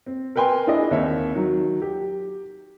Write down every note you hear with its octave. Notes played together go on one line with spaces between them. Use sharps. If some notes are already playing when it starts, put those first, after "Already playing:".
C4
A#4 B4 G5 G#5 C6
D4 E4 G#4 D5 D#5
D#2 C4 C#5 E5
D#3 F#3
G4